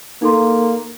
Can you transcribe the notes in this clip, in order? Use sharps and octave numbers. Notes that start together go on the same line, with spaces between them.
A#3 D#4 A4 C6